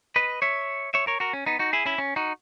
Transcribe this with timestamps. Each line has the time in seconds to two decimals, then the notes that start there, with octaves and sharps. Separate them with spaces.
0.16 B4 D#5
0.42 C#5 E5
0.94 C#5 E5
1.07 A#4 C#5
1.20 F#4 A#4
1.33 C#4
1.46 B3 D#4
1.59 D#4 F#4
1.73 E4 G#4
1.86 C#4 E4
1.98 C#4
2.16 D#4 F#4